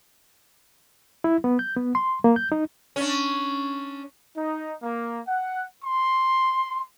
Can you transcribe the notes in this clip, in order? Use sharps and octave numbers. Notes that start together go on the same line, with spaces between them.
E4
B3
G6
B3
C6
A#3
G6
D#4
C#4 D4
D#4
A#3
F#5
C6